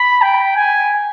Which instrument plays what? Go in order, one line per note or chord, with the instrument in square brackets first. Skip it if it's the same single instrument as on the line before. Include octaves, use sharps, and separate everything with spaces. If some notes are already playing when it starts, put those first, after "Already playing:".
Already playing: [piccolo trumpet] B5
G5
G#5